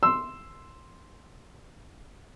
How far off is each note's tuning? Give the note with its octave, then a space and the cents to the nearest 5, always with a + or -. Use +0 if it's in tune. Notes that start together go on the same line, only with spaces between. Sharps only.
C6 +0 E6 +5